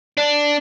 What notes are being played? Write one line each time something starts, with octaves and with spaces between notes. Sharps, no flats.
D4